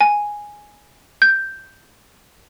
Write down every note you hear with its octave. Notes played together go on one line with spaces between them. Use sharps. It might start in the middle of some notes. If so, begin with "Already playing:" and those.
G#5
G6